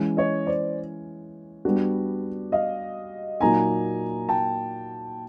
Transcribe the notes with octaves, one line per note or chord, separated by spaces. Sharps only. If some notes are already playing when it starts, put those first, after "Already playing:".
Already playing: E3 G#3 C#4
C#5 D#5
C5 D5
G3 B3 D4 F#4
D#5 F5
A#2 F#3 A#3 D#4 G#5 A#5
G5 A5